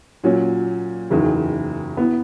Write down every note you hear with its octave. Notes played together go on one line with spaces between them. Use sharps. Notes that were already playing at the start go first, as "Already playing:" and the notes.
A#2 F#3 C#4
F#1 E2 D#3
E3 B3